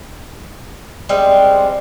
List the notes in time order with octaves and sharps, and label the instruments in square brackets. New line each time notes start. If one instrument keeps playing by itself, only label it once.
[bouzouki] G3 G#3 C4